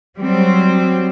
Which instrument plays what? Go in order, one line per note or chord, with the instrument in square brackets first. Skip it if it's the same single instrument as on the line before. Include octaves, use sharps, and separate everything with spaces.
[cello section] F#3 G3 C4